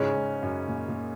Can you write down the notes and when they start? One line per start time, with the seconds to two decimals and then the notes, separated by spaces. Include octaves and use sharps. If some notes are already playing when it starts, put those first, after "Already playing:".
Already playing: G#2 C#3 G#3 C#4
0.16 G#2
0.42 F#2
0.68 A#2
0.88 A#2